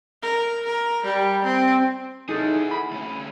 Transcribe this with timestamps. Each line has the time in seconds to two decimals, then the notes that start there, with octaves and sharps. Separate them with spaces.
0.23 A#4
0.66 A#4
1.05 G3
1.44 C4
2.29 D#4 E4 G#4 A4
2.71 B5
2.91 D2 C#4